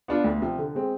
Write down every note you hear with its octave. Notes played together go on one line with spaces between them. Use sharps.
B3 D4 F4
D2
C3 F3
D3
G#3 C4